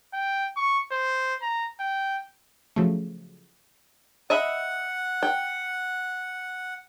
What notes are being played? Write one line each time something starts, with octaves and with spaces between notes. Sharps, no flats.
G5
C#6
C5
A#5
G5
C#3 F3 F#3 A3
D#5 E5 F#5 B5
G5